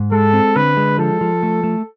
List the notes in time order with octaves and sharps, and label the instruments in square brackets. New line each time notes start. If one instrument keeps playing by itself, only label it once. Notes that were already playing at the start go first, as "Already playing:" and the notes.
Already playing: [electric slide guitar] G#2
[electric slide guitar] G#3 [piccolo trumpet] A4
[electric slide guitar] C4
[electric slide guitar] D3 [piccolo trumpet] B4
[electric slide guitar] G#3
[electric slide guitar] F3 [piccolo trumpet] A4
[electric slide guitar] F3
A3
A3